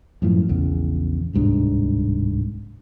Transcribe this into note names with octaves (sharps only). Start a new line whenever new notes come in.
F#2 A2 E3 F3
A#1 E2 C#3
D1 C2 G#2 D4